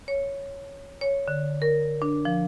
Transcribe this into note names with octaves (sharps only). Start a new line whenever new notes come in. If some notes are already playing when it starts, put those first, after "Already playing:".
C#5
C#5
D3
A#4
D4
F3